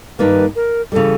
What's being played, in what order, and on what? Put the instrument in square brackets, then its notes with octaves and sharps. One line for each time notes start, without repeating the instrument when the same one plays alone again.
[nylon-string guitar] G2 D#3 G3 A#3 [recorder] B4
[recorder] A#4
[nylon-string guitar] C#3 E3 G3 [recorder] A4